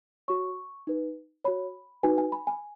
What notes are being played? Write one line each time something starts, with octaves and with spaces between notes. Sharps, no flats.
F#4 C#5 C#6
D#4 B4
F#4 C#5 B5
D#4 F#4 B4 G#5
G#5
B5
G#5